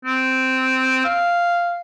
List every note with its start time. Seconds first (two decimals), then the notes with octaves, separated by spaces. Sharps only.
0.05 C4
1.05 F5